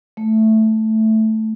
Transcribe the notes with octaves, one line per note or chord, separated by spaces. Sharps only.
A3